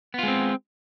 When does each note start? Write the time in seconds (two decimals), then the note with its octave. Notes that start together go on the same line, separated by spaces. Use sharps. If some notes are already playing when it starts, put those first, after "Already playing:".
0.14 B3
0.19 F4
0.23 G#3
0.28 C4